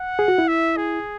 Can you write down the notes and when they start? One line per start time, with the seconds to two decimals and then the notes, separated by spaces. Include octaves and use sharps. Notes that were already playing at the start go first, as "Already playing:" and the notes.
Already playing: F#5
0.19 G#4
0.28 F#4
0.38 E4
0.48 E5
0.77 G#4